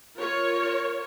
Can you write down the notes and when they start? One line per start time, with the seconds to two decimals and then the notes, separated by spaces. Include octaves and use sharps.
0.17 F4 A#4 C#5